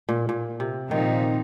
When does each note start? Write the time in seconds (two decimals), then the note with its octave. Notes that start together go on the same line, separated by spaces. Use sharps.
0.09 A#2
0.29 A#2
0.60 C3
0.90 A#2 D#3 F3 C4 D#4